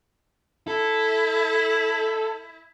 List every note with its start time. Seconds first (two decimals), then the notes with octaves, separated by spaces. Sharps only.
0.68 E4 A4